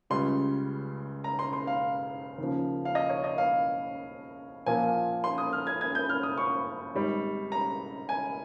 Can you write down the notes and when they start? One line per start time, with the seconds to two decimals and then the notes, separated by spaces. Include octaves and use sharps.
0.10 C#2 C#3 G3 C6
1.24 A#5
1.39 C6
1.53 C6
1.67 F5
2.38 D#2 C#3 F3
2.85 F5
2.95 D#5
3.09 C#5
3.24 D#5
3.38 F5
4.66 A#2 F3 A#3 F4 G#5
5.24 C6
5.38 D#6
5.53 F6
5.67 G#6
5.81 G#6
5.95 G6
6.09 F6
6.23 D#6
6.37 C#6
6.95 G#1 G#2 G3
7.52 A#5
8.09 G#5